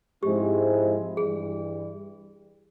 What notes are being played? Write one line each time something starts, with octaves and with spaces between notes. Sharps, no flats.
G#2 F3 G#3 C4 E4 G4
G2 E3 G3 G#4